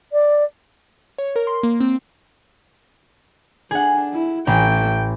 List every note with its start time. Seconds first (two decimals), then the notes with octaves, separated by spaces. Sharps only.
0.12 D5
1.18 C#5
1.36 A#4
1.47 C6
1.63 A#3
1.80 C4
3.71 D4 G#4 F#5
4.13 E4
4.47 A1 A3 G5